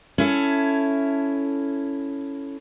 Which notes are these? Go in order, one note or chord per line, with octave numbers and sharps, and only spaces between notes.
C#4 E4 A4